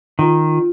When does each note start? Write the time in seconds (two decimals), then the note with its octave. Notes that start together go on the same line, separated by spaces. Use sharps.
0.19 D#3 F4